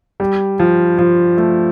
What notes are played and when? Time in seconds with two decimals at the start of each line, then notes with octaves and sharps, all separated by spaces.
0.20 G3
0.59 F3
0.98 F3
1.37 A3